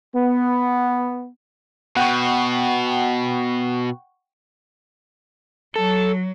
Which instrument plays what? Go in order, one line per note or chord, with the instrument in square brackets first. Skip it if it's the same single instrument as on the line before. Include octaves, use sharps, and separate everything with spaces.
[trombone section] B3
[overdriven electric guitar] B2 [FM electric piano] F#5 G5 C#6
[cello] F#3 [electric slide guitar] A4